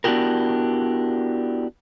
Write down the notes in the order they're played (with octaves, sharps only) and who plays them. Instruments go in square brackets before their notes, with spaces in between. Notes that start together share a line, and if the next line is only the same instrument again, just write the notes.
[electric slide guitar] B3 D4 E4 F#4 G4 A#4